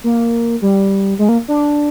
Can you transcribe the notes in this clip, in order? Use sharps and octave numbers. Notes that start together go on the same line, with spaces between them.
A#3
G3
G#3
A#3
D4